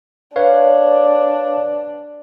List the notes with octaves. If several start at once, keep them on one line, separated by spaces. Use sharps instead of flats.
D4 B4 C#5 D5 F5